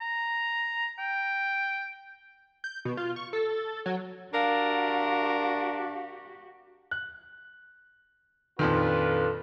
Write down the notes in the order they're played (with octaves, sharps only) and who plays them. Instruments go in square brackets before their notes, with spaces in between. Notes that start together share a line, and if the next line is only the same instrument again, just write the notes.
[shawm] A#5
G5
[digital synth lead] G6
B2
F4
C#6
A4
F#3
[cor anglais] D4 [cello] F#4 G4 [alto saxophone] A#4 [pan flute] F5
[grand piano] F#6
[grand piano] F2 A#2 D#3 [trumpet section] D4 F4 B4 [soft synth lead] A4